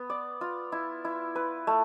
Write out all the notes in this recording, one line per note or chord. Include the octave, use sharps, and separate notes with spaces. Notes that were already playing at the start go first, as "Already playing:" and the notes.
Already playing: B3
D5
F4
E4
E4
B4
A3